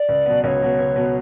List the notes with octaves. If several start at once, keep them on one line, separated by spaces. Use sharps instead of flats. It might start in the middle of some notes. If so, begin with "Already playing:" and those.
Already playing: D5
C#2
B2 F#3 B3
C#2 C#5 D5
B2 F#3 B3
C#2
B2 F#3 B3